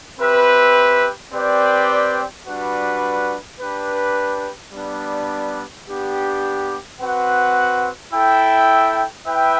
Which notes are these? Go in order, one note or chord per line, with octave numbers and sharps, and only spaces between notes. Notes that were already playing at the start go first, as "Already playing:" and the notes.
C4 G4 B4 E5
C4 G4 B4 D5 G5
G3 D4 F#4 B4
D4 G4 B4
G3 B3 D4
B3 D4 G4
C4 F#4 B4 F#5
E4 A4 E5 G5
E4 B4 E5 G5